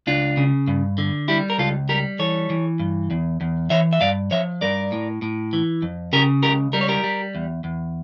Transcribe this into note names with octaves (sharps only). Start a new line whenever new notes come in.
C#2 D4 F4
C#3
G2
D3
G3 E4 G4
A#4
C#2 F4 A4
G3 G4 A#4
E3 A4 C#5
E3
G2
E2
E2
E3 C#5 E5
E5
G2 D5 F5
F3 C#5 E5
G2 A#4 D5
A2
A2
E3
F2
C#3 G4 A#4
C#2 G4 A#4
G3 A#4
C#5
G4 A#4
G3
E2
E2